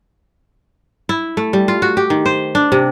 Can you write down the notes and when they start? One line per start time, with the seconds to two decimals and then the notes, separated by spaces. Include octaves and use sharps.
1.09 E4
1.37 A3
1.53 G3
1.68 F4
1.82 F#4
1.97 G4
2.10 D#3
2.26 C5
2.55 D4
2.72 C3